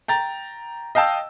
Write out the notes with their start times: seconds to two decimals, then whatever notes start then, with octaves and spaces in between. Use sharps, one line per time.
0.08 G5 A#5 A6
0.95 D#5 F5 G5 A5 E6